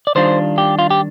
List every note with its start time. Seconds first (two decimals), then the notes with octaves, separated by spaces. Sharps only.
0.07 D5
0.15 D#3 G3 D4 F4 C5
0.58 G4
0.79 F4
0.90 G4